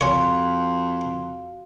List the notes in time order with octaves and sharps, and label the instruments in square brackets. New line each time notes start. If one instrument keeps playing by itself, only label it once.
[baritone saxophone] F2 [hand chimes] F#4 F5 [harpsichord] C#5 G#5 [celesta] C6